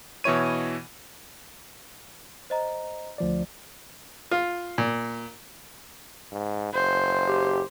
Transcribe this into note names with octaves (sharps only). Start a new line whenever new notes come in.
B2 E3 E4 C#5 D#7
C5 D#5 A#5
D2 F3 D5
F4
A#2
G#2
F#1 C5
G4